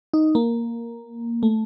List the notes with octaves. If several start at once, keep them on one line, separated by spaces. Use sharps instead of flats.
D#4
A#3
A3